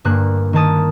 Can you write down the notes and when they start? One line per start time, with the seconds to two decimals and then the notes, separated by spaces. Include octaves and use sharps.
0.05 G1 G2 A#3 F#6
0.53 D#3 A#3 A5 D#6